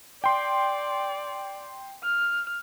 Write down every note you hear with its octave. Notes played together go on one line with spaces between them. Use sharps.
D5 G5 C6
F6